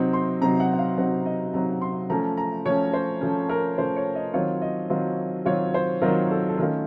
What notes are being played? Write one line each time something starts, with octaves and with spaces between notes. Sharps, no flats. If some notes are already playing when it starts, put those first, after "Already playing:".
Already playing: C3 F#3 C4 D#4
C6
C3 F#3 C4 D#4 A#5
F#5
F#5
F5
C3 F#3 C4 D#4 F#5
D#5
C3 F#3 C4 D#4 A#5
C6
F3 A3 C#4 A#5
A#5
F3 A3 C#4 C#5
C5
F3 A3 C#4
A#4
F3 A3 C#4 C5
C#5
D#5
D#3 F#3 C4 F4 C#5
D#5
D#3 F#3 C4 F4
D#3 F#3 C4 F4 C#5
C5
D#3 F#3 C4 F4 A#4
A4
A4
D#3 A3 C#4 F4 A#4